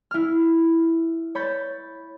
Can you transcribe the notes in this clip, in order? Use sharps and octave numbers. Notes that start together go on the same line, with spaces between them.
E4 F6
C#5 B5 G6 A6